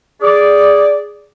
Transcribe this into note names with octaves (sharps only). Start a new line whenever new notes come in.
G#4 D5